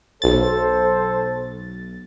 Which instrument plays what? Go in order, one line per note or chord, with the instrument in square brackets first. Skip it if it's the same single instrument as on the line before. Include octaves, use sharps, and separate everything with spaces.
[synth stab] B1 A6 [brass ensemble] A4 C5